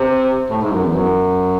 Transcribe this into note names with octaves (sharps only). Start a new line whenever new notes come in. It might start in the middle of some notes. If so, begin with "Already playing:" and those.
Already playing: C3
A2
G#2
F#2
E2
F#2